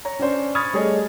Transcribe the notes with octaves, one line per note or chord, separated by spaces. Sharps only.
C#5 A#5
C#4 D4 C5 C#5
B5 C#6 D#6 F6 G#6 A6
G3 A3 G#4 C#5 D#5